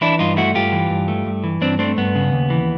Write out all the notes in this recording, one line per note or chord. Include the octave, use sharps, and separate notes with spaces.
E3 D4 E4
G2 D#4 F4
A3 E4 F#4
G2 F4 G4
E3
G2
A3
G2
E3
G2 C4 D4
A3 C4 D4
G2 B3
C#3
D#2
E3